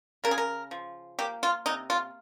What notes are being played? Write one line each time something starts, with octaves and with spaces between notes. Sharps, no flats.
C#3 A#4
G#4
A#4
F3
A#3 G4
F4
C3 D#4
F4